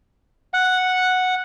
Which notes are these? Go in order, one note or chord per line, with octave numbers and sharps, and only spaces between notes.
F#5